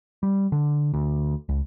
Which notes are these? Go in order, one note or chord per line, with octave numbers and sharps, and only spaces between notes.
G3
D3
D2
C#2